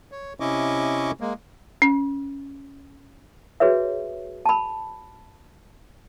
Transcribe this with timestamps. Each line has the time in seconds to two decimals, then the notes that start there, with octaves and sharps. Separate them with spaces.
0.12 C#5
0.40 C3 C#4 E4 D#5 C#6 D6
1.21 G#3 A#3
1.82 C#4
3.60 F#4 G#4 B4 C#5 E5
4.46 A5 B5